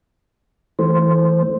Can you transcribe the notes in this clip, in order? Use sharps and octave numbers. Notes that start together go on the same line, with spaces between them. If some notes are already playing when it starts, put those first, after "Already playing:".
E3 A3 C5